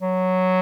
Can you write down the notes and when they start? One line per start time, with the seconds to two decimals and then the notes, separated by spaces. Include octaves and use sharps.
0.02 F#3